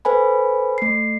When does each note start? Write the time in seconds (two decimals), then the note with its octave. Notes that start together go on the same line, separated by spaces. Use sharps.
0.05 A4 B4 C5 G#5 B5
0.78 A3 C7